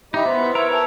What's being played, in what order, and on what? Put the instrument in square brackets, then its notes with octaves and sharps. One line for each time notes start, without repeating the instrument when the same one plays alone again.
[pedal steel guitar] D#4 [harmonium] E4 G4 D#5 [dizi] E5
[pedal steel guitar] B3 [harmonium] C5
[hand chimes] E4 B4
[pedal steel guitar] A#4 C#5 [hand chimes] B4 E6
[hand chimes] B4 G#5 E6 [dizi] A5